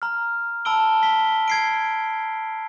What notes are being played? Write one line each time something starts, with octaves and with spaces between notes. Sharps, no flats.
A#5 F6
A5 B5 E6 D7 G7
B6 G7
G#6 C7 D7